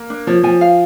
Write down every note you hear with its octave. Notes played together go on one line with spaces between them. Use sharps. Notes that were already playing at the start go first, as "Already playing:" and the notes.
Already playing: A#3
D4
F3 C#5
F3 G#5
F5